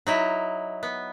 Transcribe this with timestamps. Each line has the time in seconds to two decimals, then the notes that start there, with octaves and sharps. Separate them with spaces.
0.07 F#3 D#4 E4
0.83 B3